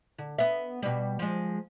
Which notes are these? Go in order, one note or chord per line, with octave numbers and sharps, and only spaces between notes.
D3
B3 E5
B2 G3
F3 G#3